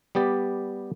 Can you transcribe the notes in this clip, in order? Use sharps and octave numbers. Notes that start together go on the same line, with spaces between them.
G3 B3 G4 D5